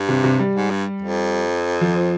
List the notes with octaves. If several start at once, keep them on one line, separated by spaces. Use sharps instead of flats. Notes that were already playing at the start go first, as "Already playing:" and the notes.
Already playing: G2
C3
C3
G3
G#2
G2
F2
F3